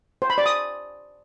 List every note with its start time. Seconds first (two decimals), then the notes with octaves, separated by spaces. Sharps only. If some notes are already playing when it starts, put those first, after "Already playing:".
0.22 C5
0.30 B5
0.38 D5
0.46 D#6